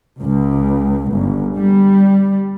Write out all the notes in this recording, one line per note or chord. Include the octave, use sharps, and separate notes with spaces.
C#2
G1
G3